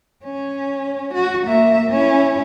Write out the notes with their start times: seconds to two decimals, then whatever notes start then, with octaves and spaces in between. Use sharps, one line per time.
0.23 C#4
1.14 F#4
1.47 A#3 E5
1.90 C#4 E4